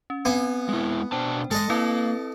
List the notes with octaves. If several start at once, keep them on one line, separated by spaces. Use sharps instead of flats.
C#4
B3 C4 G#5
G#3 E4
B2 D4 C5 G5 A5
G#3 A4 D#5
A#3 C4 E4 B4